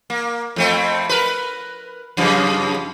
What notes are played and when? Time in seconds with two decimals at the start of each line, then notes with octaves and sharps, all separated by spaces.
0.10 A#3
0.56 F2 A3 C4
1.09 A#4 B4
2.17 F#2 C#3 F3